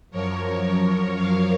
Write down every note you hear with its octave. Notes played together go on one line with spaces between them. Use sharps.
F#2 F3 A#4 C#5
C#5 F5